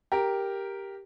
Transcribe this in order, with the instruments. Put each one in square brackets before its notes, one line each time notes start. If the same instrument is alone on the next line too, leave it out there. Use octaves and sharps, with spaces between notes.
[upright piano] G4 A#4